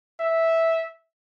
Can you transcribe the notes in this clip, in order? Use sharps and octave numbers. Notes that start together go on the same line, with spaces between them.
E5